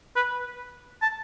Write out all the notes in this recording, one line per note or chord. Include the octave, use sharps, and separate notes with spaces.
B4
A5